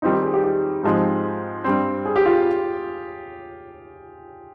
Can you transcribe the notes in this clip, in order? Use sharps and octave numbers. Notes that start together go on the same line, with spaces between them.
D#3 G3 C4 D#4 F4
G4
G#4
G4
G4
G#2 F3 G#3 C4 G4
G2 G3 C4
G#4
G4
F4